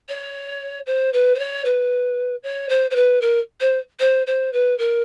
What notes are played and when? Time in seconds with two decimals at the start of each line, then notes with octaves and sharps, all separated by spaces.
0.09 C#5
0.87 C5
1.13 B4
1.35 C5
1.39 C#5
1.65 B4
2.43 C#5
2.69 C5
2.91 C5
2.96 B4
3.21 A#4
3.61 C5
4.00 C5
4.27 C5
4.53 B4
4.78 A#4